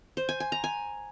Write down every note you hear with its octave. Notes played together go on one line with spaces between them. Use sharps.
C5
G#5
G#5
A#5
G#5